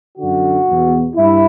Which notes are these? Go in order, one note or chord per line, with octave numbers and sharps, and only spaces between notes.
F#2 D3 F#4
E2 B2
G2 E4